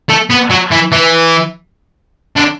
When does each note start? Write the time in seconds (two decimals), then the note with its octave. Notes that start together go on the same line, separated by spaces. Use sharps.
0.09 A3
0.30 B3
0.50 F#3
0.71 E3
0.92 E3
2.36 D3